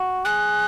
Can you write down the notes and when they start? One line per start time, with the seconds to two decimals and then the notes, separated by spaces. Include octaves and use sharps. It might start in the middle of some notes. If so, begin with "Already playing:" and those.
Already playing: F#4
0.25 G#4 F#6